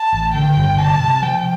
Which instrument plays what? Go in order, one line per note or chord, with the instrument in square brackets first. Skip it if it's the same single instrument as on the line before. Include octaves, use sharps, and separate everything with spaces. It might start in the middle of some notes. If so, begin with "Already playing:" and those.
Already playing: [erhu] A5
[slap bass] A1
[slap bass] D3 [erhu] G5
[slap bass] G1
[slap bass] C3 [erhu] A5
[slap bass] C3
[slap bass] F3 [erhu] G5